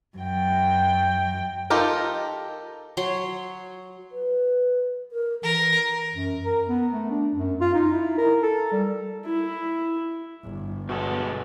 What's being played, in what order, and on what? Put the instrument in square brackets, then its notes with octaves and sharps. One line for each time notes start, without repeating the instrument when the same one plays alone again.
[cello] F#2 G5
[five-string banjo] D#4 F4 G4 A4 A#4
[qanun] F#3 C#5 C6
[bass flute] B4
A#4
[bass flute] E3 [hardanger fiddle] A#4
[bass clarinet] F#2
A#4
B3
A3
D4
F#2
F4
D#4
E4
A#4
A4
G3
[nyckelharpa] E4
[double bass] G1
[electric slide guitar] B2 G#3 A4 [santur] F#4 G#5 D6